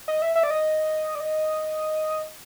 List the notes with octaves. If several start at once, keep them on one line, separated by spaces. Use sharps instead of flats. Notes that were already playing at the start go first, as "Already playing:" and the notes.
D#5
E5
E5
D5
D#5
D5
D#5